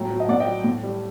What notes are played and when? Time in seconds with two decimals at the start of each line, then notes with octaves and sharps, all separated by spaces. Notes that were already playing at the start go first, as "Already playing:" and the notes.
Already playing: A2 F#3 G5 A#5
0.10 F#3
0.20 D#5
0.29 A2 D5 F#5
0.40 D#5 G5
0.46 F#3
0.64 A2
0.83 G3